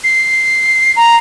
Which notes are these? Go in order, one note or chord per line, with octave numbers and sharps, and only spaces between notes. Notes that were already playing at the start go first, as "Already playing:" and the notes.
C7
A#5